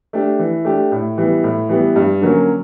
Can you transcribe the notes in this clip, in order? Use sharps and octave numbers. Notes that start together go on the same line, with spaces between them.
A3 D4 G4
E3
A3 D4 G4
A2
E3 G3 B3
A2
E3 G3 B3
G2
D3 F#3 A#3 C#4